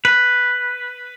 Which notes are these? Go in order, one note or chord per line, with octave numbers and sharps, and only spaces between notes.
B4